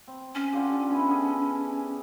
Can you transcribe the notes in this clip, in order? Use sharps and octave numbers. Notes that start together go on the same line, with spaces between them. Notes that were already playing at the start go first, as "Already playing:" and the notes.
C4
C#4
D3 F4 G4
B3 D4 E4
G#4 A4